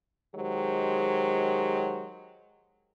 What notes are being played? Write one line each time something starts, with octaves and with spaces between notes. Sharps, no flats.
D#3 F#3 G#3 G4 C5